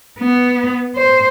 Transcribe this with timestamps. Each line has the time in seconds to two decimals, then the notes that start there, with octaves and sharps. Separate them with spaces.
0.19 B3
0.96 C5